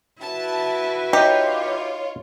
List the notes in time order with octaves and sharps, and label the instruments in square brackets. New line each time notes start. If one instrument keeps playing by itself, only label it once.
[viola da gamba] E4 F#4 B4 [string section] A5
[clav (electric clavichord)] D#4 [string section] F4 C#5 [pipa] G4